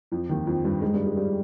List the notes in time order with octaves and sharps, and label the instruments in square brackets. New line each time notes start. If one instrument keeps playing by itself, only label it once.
[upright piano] F2 F3
D#2 D#3
F2 F3
G2 G3
G#2 G#3
G2 G3
G#2 G#3
G2 G3